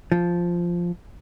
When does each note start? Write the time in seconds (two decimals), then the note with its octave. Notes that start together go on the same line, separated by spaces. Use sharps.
0.12 F3